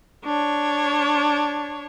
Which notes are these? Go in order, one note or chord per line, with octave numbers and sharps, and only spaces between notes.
D4 C#5